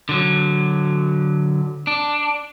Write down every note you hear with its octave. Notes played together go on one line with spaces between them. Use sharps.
D3 F#3
D4